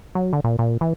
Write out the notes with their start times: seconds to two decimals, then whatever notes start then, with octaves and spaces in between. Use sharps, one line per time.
0.15 F#3
0.33 D3
0.44 A#2
0.59 A#2
0.81 E3